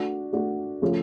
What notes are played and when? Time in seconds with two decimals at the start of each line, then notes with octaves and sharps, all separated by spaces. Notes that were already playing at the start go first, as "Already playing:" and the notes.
Already playing: A3 D4 F#4
0.33 A3 D4 F#4
0.82 C#3 F3 A3 C#4 F4